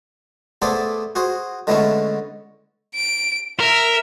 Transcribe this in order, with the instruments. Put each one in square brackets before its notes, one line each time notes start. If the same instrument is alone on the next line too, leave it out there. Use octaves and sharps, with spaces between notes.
[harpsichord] A3 B3 G#4 A4 C5 D5
F#4 G#4 C5
D3 G#3 A3 B3 C#4 E4
[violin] D7
[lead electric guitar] A#4 [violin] E5